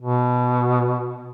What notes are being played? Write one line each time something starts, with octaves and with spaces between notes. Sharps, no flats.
B2